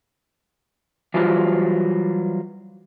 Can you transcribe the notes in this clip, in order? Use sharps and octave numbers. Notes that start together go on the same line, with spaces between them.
E3 F#3 G3 E4 F4 C5